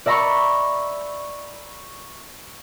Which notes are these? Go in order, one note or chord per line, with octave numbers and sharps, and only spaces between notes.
D5 E5 A#5 B5 C#6